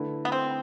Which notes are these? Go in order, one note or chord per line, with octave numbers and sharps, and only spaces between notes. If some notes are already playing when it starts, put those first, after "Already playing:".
Already playing: D3 A3 E4 B4
B3
C4